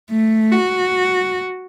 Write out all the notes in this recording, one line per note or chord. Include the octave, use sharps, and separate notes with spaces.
A3
F#4